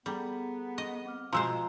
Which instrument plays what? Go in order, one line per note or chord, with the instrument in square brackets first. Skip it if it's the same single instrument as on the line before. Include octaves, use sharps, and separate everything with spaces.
[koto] G3 [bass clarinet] B3 [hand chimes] G#4 A4 A#5
[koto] D#5
[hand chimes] C4 D6 F6
[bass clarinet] B2 [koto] F3 G#3 C5 [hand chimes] F4 [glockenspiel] A#5 E6